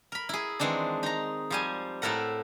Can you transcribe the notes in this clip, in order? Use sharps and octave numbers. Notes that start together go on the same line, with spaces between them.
A#4 B5
E4 G#4
D#3 E3 G#3 C4 D4
D#4 A#5
F3 G3 G#5
A2 E4 A4 A#4 F#5